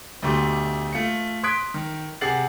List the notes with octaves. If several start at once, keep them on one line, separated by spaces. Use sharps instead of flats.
D2 B2 A3 G4 C6
A3 F4 C#7
C6 D#6 F#6 G#6 B6 D7
D#3
C3 G#4 F#5 A6 C7 F#7